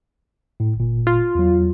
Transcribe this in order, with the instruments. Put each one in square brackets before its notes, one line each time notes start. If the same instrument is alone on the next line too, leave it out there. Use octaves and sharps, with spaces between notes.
[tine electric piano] A2
G1 A#2
[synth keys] F4
[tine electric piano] E2 F#3